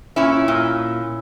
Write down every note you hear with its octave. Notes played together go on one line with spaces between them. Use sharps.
A#2 C#4 E4
A#2